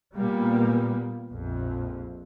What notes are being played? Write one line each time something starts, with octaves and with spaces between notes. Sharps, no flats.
A#2 G3 A#3 B3
A#1 F2